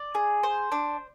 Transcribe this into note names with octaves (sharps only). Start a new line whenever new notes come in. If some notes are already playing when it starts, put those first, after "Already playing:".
Already playing: D5
G#4
C5
D4